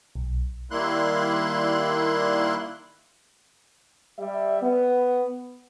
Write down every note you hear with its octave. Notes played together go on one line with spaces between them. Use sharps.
B1
D#3 G3 A#3 E4 C6 F#6
G3 E5
B3